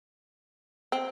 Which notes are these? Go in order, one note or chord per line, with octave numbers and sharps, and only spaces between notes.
C4